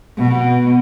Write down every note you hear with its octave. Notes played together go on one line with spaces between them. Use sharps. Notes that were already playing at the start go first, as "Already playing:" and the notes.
B2